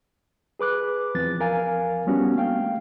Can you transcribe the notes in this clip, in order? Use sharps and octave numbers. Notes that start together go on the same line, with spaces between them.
G#4 B4 D6 F#6
E2 F3 C4 A6
F3 A#4 F5 G#5
G3 B3 C#4 D4 F#4 G4
A3 A#3 F5 G5